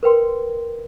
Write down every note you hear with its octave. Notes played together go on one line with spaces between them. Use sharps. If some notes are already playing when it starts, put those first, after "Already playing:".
A#4 B4 G5 C6